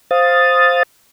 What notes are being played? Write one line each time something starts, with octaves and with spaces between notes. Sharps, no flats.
C5 F5 D#6 A6